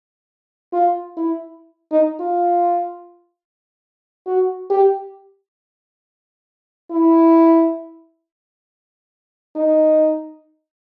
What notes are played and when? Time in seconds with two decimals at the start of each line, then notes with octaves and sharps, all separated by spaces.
0.73 F4
1.17 E4
1.91 D#4
2.20 F4
4.26 F#4
4.70 G4
6.91 E4
9.56 D#4